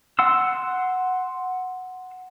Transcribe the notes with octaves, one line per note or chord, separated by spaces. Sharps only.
F#5 C6 E6